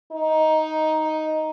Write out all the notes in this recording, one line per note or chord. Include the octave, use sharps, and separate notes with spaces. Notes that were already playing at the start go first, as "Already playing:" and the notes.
D#4